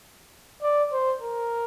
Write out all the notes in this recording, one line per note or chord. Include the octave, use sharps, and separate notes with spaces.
D5
C5
A#4